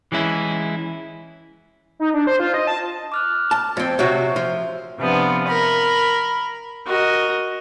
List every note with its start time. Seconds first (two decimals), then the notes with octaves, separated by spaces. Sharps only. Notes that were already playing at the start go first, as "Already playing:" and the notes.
0.12 E3 G#3 C#4 E4
1.99 D#4
2.14 D4
2.27 C5
2.40 F4
2.54 D#5
2.67 A5
3.12 D6 F6 F#6
3.51 A5
3.77 F2 C4 C5
3.99 C3 F#3 F#4 E5
4.36 F3
4.99 C3 F3 B3 D4
5.47 A#4 B5
6.87 F#4 A#4 D#5